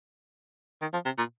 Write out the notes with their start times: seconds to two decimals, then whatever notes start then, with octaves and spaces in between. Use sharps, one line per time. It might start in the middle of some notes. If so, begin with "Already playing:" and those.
0.82 D#3
0.93 F3
1.05 C3
1.18 A#2